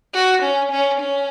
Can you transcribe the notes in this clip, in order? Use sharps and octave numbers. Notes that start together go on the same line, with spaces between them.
F#4
C#4
C#4
C#4